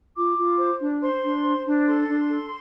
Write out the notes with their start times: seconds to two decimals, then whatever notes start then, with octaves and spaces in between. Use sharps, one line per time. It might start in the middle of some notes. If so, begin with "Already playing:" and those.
0.15 F4 D6
0.37 F4
0.58 C5
0.80 D4
1.01 C5 C6
1.23 D4
1.43 C5
1.65 D4
1.86 A4 C6
2.07 D4
2.29 A4